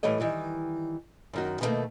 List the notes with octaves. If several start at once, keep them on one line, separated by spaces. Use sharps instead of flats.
A2 E3 G3 A3 C#5 D#5
D#3 E3 G3
F#2 D#3 F#4
B2 D#3 F3 G3 A3 A#3